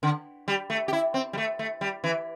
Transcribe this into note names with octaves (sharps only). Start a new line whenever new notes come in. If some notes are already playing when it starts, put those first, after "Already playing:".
D3
G3
A3
G4
E4
C4
G3
A3
A3
G3
E3